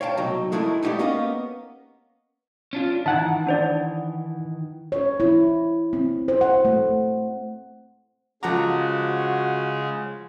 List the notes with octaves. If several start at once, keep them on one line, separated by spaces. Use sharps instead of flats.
C#5 F5 G5 A5
C2 B2 F#3 D#4
E3 G#3 A3 D#4 E4 A#4
D#4 E4 F#4 G4 D5
A#3 B3 C#4 A#4 D#5 F5
C#4 D4 F4
D#3 E3 D#4 E5 F#5 A5
D4 C5 D5
C#5
E4
C4
C5
F#5
A3
C#3 F3 G#3 F#4 A4 F#5 A#5 D6